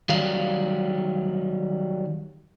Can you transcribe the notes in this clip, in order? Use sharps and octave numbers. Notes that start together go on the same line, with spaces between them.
D#3 F#3 G3 F5